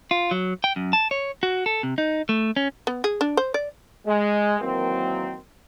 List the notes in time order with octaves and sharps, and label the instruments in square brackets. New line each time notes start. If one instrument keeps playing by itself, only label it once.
[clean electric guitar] F4
F#3
G5
F#2
A5
C#5
F#4
A4
C3
D#4
A3
C#4
[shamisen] B3
G#4
D4
C5
D5
[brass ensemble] G#3
D#3 E3 F#3 A#3 C4